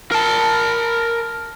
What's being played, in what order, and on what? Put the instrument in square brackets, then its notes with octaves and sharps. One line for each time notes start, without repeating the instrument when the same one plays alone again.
[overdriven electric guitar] A#4 A5